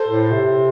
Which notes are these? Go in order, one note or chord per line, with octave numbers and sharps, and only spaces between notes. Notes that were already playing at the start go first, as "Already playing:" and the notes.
Already playing: A4 C5
A2
C3